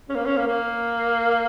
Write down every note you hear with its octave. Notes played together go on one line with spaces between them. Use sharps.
C#4
A#3
C#4
A#3
A#3